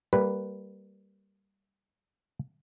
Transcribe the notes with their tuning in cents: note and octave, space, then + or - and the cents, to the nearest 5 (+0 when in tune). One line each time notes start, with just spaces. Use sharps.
G3 +0 A#3 -15 B4 +0